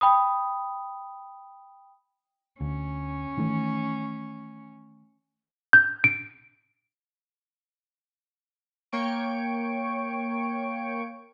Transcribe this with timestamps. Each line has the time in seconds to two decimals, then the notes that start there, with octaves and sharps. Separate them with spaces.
0.01 G5 B5 D#6
2.61 D2 C#4
3.38 D#3 E3 A3
5.73 G6
6.04 D7
8.92 A#3 C#5 G5 C#6 D7